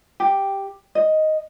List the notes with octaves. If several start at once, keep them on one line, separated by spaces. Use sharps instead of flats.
G4
D#5